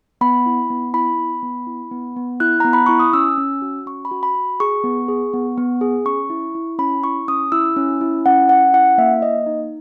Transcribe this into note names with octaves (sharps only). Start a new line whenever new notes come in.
B3 B5
E4
B3
E4 B5
B3
B3
E4
B3
B3
E4 F#6
B3 A#5
B5
E4 C#6
D#6
C#4 E6
C#4
F#4
C#4 C#6
B5
F#4
B5
F#4
G#4 C#6
B3
G#4
B3
B3
G#4
C#4 C#6
E4
E4
C#4 B5
E4 C#6
C#4 D#6
E4 E6
C#4
E4
C#4 F#5
C#4 F#5
E4 F#5
A#3 E5
A#3 D#5
D#4